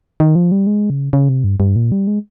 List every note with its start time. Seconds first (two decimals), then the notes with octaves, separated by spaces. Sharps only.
0.20 D#3
0.35 F3
0.52 G3
0.67 G#3
0.90 C#3
1.13 C#3
1.29 C3
1.44 G2
1.60 G2
1.76 A#2
1.92 G3
2.07 G#3